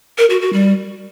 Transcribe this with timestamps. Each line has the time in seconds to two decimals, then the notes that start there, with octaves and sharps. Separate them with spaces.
0.18 A#4
0.30 F#4
0.41 F#4
0.53 G3